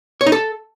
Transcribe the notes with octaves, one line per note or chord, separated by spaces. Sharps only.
C#5
D#4
A4